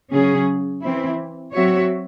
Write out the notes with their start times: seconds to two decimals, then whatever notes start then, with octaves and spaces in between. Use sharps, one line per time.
0.12 C#3 F#3 C#4 G#4
0.83 E3 C4 E4
1.54 F#3 C4 F#4 C#5 E5